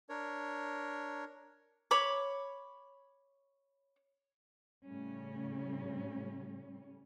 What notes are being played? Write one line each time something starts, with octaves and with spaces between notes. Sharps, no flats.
D4 A#4 C#5
C#5 B5 D6
A2 C#3 G3 C#4